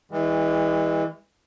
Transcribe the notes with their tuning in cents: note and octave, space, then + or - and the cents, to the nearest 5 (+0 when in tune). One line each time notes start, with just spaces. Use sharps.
E3 -20 G#3 -45